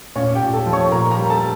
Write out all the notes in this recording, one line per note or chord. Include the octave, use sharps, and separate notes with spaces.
A#2 C#4 C#5
G4 G5
A#2
A4 A5
F3
C#5 C#6
A#2 A#4 A#5
A#4 A#5
G3
A4 A5